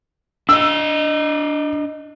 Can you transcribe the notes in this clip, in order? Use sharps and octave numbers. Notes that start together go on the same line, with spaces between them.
D4 D#5 E6